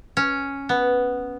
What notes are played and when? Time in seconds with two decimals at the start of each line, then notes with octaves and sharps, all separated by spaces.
0.17 C#4
0.69 B3